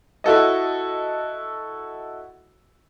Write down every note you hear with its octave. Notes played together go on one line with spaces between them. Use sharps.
E4 F#4 A4 D#5